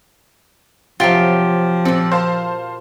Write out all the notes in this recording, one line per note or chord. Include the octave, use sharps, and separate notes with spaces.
C3 F3 F#3 F4 G4
A#2 C4 A4
C5 F5 A5